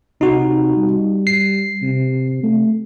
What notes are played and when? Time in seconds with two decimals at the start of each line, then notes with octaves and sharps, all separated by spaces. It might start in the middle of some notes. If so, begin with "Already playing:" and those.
0.21 C3 D#4 F#4
0.76 G3
1.27 C7
1.83 C3
2.44 A3